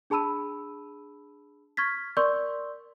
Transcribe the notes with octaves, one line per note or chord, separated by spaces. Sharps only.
D4 G#4 A5 B5 E6 D#7
C#6 F6 G#6 A6 B6
A#4 D5 C6 C#6 E6 G6